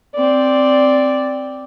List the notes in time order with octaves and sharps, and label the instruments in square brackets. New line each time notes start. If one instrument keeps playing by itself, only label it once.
[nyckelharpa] C4 D5